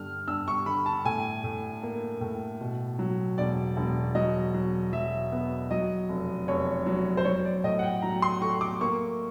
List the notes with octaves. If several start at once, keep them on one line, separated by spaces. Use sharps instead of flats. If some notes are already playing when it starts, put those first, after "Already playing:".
Already playing: G2 D3 F6
G2 E6
C#6
D3 B5
A5
A2 G#5
A2
A#3
A2
B2
F#3
E1 D5
E1
F#3 D#5
F#3
F#3 E5
B3
F#3 D#5
F1
F1 C#5
F#3
C5
F#3 C#5
D5
A2 D#5
F#5
G5
F#3 A#5
C6
A3 C#6
D6
A#3 C#6